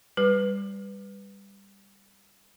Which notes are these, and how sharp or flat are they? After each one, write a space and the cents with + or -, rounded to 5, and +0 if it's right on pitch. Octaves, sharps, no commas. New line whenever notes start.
G3 +20 B4 +0